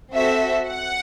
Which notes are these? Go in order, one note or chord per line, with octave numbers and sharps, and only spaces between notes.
C4 F#4 A4 E5
F#5